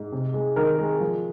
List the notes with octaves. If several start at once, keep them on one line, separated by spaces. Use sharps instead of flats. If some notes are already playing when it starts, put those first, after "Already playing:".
Already playing: G#2
C3
G#3
D#3 A#4
G#3
F3